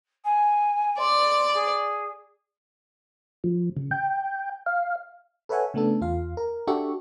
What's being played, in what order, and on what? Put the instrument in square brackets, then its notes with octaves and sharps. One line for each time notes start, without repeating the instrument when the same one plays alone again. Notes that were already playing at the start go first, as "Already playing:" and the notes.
[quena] G#5
[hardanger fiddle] D5 [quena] C6
[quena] G#4
[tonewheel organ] F3
C#3
G5
F5
[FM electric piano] A4 B4 C#5 E5 F#5 G#5
C#3 A3 B3 D4 A4
E2 F4 F5
A#4
D4 F#4 G4 A4 E5 C#6